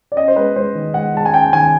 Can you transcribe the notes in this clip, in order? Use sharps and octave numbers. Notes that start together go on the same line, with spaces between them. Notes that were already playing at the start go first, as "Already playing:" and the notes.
D5
C#4 D#5
C5
G#3 B4
G#3 C5
D#3
G#3 F#5
G#3 A5
G#5
C#4 G5
D#3 G#5